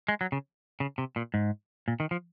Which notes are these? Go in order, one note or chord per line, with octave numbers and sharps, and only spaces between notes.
G#3
F#3
C#3
C#3
C3
A#2
G#2
A#2
D#3
F3